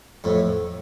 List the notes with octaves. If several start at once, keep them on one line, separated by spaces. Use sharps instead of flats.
F2 A2